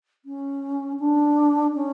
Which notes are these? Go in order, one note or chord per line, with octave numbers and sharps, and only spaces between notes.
C#4
D4
C#4